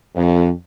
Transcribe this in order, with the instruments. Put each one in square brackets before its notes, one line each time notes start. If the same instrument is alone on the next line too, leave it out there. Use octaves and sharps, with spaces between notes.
[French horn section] F2